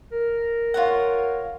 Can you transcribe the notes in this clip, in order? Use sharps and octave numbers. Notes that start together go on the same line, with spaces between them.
A#4
F4 C#5 F#5